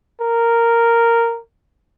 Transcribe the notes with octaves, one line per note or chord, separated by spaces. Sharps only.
A#4